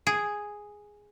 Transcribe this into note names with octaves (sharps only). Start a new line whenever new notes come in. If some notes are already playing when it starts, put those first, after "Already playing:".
G#4